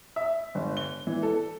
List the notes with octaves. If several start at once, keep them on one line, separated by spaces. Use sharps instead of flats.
E5
G1
G7
E3
A4